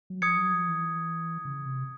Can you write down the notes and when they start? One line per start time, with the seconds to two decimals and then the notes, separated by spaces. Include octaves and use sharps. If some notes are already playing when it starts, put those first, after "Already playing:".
0.10 F#3
0.21 F3 D#6 G#6 C#7
0.37 F#3
0.53 F3
0.69 E3
1.45 C#3
1.65 C3